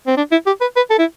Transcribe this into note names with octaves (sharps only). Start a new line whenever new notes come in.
C4
D4
E4
G4
B4
B4
A4
E4